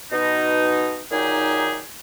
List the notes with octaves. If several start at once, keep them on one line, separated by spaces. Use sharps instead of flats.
B2 D#4
A#2 D#3 F#3 D#4 G4 G#4